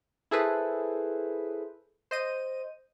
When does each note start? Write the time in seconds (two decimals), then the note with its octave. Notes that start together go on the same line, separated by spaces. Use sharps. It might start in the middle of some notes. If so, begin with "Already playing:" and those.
0.31 E4 G#4 A4 B4 C5
2.11 C5 D#5 D#7